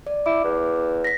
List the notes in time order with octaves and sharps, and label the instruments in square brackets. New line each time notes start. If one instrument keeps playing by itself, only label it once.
[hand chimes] D5
[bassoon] E4 [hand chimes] D6
[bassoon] E2
[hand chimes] A#6 B6